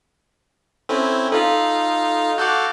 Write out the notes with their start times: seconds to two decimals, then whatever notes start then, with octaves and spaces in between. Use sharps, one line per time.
0.89 C4 C#4 E4 A4
1.32 D#4 F4 A4 F5
2.38 F#4 A4 F5 D6 F#6 G6